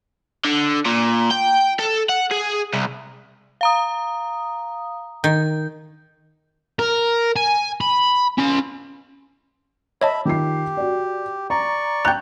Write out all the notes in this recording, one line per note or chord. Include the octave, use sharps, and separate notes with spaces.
D3
A#2
G5
A4
F#5
G#4
C2
F5 A#5 D#6
D#3 G6
A#4
G#5
B5
C#4 C6
C#5 D#5 E5 A5 B5
D#3 F4 G4 C7
F#4 D5
D5 A#5 C#6
G5 A#5 F#6 G6